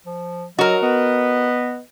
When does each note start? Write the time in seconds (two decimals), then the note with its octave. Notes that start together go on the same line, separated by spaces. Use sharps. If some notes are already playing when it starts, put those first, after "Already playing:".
0.06 F3
0.59 F#3 F#4 A#4 D#5
0.83 B3 B4 D#5